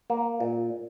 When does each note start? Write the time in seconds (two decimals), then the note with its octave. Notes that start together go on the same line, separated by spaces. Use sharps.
0.10 A#3
0.40 A#2